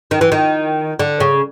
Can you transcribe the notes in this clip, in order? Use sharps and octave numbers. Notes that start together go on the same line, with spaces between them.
D#3
E3
D#3
D3
C#3